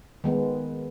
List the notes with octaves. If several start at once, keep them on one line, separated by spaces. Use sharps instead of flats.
D#3 G#3 B3